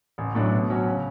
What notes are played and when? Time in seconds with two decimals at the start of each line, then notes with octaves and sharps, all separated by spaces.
0.18 A1
0.35 A2 F#3 A3 D4
0.52 B2
0.69 F#3 C#4 F#4 C#5
0.87 C#3